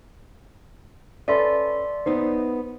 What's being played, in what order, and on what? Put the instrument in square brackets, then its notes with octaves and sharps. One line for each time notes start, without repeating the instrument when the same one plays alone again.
[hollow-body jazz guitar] C#4 A4 B4 [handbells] D5 E5 C6
[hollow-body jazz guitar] B3 D#4 C5